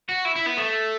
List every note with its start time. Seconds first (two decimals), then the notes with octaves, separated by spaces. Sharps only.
0.09 F#4
0.25 E4
0.35 E4
0.46 B3
0.57 A3